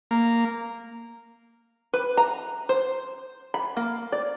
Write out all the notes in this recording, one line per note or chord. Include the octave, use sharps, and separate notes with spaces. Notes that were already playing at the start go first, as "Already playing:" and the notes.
A#3
B4
A#5
C5
B5
A#3
D5